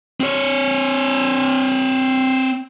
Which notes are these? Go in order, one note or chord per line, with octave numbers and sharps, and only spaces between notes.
C4 C#5